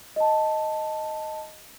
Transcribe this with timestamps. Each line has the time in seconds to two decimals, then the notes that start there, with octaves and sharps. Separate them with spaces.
0.16 D#5 A5